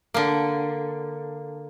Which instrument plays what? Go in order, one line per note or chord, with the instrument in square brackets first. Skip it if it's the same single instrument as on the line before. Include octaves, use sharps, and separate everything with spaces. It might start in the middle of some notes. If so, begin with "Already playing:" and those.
[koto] D3 A#3